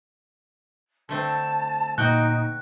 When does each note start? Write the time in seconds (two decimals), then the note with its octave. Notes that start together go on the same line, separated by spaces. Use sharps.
1.09 D3 A3 C4 A5
1.98 A#2 D#4 F#4 G5 F#6